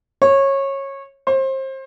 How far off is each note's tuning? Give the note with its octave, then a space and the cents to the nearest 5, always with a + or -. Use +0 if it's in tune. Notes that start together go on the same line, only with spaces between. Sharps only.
C#5 -20
C5 +30